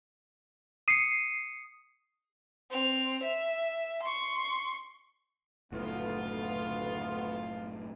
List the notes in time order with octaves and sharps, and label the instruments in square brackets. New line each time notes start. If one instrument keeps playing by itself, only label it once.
[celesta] D#6 C#7 [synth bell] C7 D#7
[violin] C4 F7
E5
C6 C#6
[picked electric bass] F#1 A2 [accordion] D2 B3 [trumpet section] F4